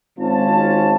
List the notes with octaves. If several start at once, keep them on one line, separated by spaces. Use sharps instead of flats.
G#1 C#4 F4 A5